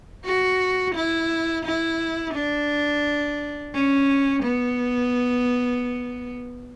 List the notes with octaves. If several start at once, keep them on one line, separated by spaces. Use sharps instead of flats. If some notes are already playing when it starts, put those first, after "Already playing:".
F#4
E4
E4
D4
C#4
B3